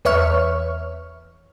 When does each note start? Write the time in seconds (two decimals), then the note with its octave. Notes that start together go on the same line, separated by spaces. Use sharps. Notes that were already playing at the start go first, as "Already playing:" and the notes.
0.05 E2 B4 C#5 E5 C#6 F6